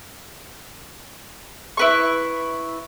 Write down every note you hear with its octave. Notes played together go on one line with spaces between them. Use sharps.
E4 B4 C#6